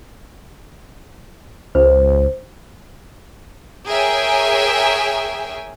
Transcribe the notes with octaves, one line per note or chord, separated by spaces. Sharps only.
C#2 C5
G#4 A#4 C#5 E5 G5 G#5